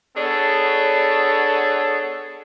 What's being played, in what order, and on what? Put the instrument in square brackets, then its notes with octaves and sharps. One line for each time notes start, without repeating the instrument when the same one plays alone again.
[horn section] B3 D4 G#4 A4 C#5